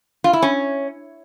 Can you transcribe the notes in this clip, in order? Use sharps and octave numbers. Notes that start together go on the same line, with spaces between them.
F4
E4
C#4